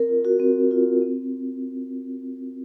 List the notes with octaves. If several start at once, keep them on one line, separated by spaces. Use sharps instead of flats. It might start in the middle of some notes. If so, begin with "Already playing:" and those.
Already playing: C4 A#4
F4
F#4
C4
F4
C4